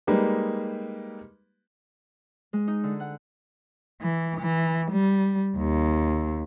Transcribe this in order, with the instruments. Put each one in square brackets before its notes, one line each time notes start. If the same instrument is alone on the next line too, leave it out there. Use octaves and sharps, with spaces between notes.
[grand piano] G3 G#3 A#3 D#4 G4 B4
[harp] G#3
D#4
D3
F#5
[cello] E3
E3
G3
D#2